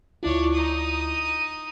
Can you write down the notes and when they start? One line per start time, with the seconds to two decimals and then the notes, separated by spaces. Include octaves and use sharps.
0.23 D2 D4 E4 F4 C#5
0.53 D#4 D#6